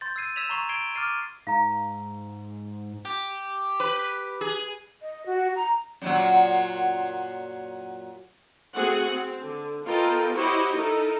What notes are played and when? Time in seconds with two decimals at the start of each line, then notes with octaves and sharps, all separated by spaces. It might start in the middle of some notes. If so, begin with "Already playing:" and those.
0.01 C6 G6 A6
0.16 E6 G#6 C7 D#7
0.36 E6 G#6 B6 E7 F7
0.49 A#5 C6 C#6 C7 F7
0.69 G#6 C7 D7 G7
0.95 D6 F6 A6 C7 D#7
1.47 G#2 F5 A#5
3.05 G4
3.80 B4
4.41 G#4
5.02 D#5
5.26 F#4
5.56 A#5
6.02 F#2 A#2 F#3
8.74 A3 C4 F#4 G#4 F#5
9.11 C4
9.42 D3
9.85 B3 F4 A4 A#4 D#5 G5
10.33 E4 F#4 G4 C5 C#5 D#5
10.74 D#4 E4 A4 A#4